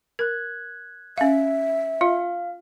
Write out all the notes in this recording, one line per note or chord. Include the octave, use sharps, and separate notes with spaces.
A#4 F#6 G#6
C#4 E5 F5
F4 F5